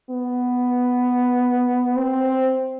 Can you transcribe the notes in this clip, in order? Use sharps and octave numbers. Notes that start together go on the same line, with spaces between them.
B3
C4